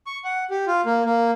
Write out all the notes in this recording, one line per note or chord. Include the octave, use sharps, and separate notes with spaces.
C#6
F#5
G4
F4
A#3
A#3